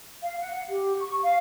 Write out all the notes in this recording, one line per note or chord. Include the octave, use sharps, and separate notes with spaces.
F5
F#5
G4
C#6
F5